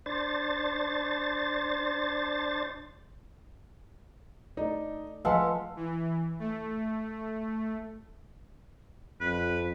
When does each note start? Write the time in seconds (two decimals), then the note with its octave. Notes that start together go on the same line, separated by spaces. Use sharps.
0.06 D4 C5 A6
4.57 A3 D#4 A4 D5
5.25 F3 G#3 A3 A4 B4 F5 F#5 A5
5.76 E3
6.39 A3
9.21 F2 B4